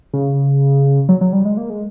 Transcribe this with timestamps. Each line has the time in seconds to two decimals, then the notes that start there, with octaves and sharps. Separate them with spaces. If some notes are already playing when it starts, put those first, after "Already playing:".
0.13 C#3
1.09 F#3
1.21 F#3
1.33 G3
1.45 G#3
1.57 A#3
1.70 G#3